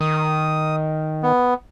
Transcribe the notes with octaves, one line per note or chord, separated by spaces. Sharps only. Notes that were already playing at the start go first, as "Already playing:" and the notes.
D#3 D#6
B3